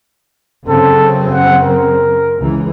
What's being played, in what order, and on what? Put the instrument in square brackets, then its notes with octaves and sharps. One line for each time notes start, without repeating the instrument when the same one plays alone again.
[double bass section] F#2 C#3 C4 [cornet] A4
[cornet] F#5
A#4
[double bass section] C#2 E3